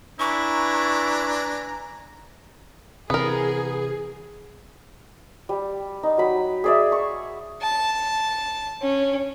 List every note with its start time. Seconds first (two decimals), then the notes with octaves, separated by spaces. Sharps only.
0.20 D4 E4 B4 G#5 A#5 C#6
3.10 C3 E3 B3 G#4 A#4
5.49 G3
6.03 D#4
6.18 F#3 B5
6.64 G#4 D5 E5
6.92 C#6
7.62 A5
8.82 C#4